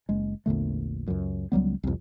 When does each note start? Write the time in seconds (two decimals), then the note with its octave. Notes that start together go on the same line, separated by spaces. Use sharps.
0.09 F#1 G#3
0.46 A#1 E2 D3 A3
1.08 C#2 F#2
1.52 C#2 F#3 G3 B3
1.83 C2 F2